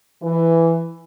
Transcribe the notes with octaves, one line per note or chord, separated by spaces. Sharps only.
E3